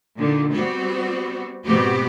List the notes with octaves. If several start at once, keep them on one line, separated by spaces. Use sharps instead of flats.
A#2 D3 D#3
G3 B3 C4 F#4
G#2 B2 B3 C4 F#4 G4